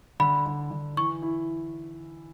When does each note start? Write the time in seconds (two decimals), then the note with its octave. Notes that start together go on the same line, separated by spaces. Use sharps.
0.20 D3 B5
0.46 D3
0.71 D3
0.97 E3 C#6
1.22 E4